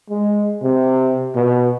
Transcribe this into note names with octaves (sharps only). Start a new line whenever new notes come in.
G#3
C3
B2